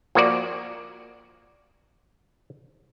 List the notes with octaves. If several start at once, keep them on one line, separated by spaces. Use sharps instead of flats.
F3 A#3 F#4 D5